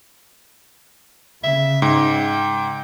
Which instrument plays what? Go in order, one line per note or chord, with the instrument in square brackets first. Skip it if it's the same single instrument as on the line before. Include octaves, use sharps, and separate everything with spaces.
[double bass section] C#3 [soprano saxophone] E5
[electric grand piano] G#2 [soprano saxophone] G5